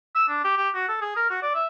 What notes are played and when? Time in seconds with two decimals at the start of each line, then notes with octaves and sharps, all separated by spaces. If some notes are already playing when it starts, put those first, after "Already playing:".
0.16 E6
0.29 D4
0.44 G4
0.57 G4
0.75 F#4
0.89 A4
1.01 G#4
1.17 A#4
1.30 F#4
1.43 D5
1.55 E5